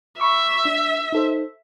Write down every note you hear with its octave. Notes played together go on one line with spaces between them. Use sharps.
E5 B5 C#6 D6
D4
D#4 A4 C5